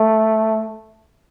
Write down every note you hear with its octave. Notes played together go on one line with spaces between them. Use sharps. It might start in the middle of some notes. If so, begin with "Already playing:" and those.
Already playing: A3